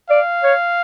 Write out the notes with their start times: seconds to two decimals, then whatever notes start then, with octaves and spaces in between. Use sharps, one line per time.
0.10 D5 F5
0.43 C#5